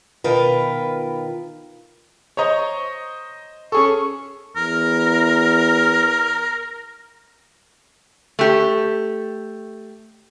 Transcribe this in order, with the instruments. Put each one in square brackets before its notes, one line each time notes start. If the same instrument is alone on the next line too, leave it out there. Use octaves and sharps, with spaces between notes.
[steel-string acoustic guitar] B2 D#3 F4 A#4 B4
[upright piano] C5 D#5 [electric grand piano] C#5 A#5 C#6
[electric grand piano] C#4 G#4 A4 [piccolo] C#6
[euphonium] E2 [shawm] A#4
[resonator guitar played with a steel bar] A3 G4